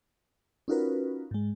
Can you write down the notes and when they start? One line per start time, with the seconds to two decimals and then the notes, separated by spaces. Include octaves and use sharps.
0.68 C#4 D#4 F4 F#4 A#4 B4
1.31 G#2 G#3